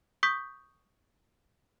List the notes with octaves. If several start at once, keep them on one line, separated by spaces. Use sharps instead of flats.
C#6 D#6 G6 B6